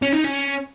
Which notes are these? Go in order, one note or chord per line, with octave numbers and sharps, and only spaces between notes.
C#4
D#4
C#4